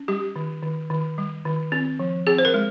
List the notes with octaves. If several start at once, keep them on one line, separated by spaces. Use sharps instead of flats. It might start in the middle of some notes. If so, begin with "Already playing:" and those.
Already playing: C#4
G3 G4
D#3
D#3
D#3
G3
D#3
C4
F3
C4 G#4
C5
A#4
G#3